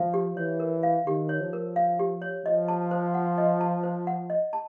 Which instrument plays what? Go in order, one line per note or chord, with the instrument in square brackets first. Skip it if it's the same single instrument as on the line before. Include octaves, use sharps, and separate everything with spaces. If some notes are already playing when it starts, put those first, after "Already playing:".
Already playing: [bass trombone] F3 [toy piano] F5
[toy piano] G4
[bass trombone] E3 [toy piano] C#5
[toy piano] A#4
F5
[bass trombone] D#3 [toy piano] G4
[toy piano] C#5
[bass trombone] F3
[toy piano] A#4
F5
G4
C#5
[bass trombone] F3 [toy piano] D#5
[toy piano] A5
C5
F#5
D#5
A5
C5
F#5
D#5
A5